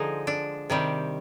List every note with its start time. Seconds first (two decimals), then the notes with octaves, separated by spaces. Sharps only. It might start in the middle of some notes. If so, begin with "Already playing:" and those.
Already playing: D3 F3 G#3 D#4
0.27 D4
0.70 C3 D#3 G3